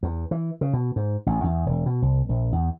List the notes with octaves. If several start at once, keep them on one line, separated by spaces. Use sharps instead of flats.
E2
E3
C#3
B2
G#2
A1
E2
E1
B2
C2
A#1
E2